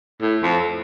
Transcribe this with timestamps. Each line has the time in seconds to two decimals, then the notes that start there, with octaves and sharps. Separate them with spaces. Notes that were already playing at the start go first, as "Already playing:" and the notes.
0.21 A2
0.42 F2